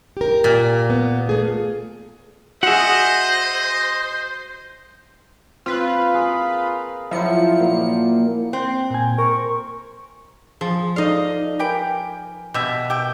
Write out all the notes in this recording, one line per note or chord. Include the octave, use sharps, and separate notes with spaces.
G4 A#4
A#2
B3
A3 G#4
F#4 G#4 C5 D#5 E5 F#5
C4 F4 B4
G#4 A#4
F3 F#3 E4 C#7
A#2 A#3
C4
A#2 G#5
A#4 C#6
F3 G#4
D#4 A4 D5 D#5 F5
G4 A#4 B4 G5 G#5
B2 G4 E5
G4 G5